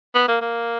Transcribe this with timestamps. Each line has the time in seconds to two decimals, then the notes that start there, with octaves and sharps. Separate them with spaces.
0.15 B3
0.28 A#3
0.41 A#3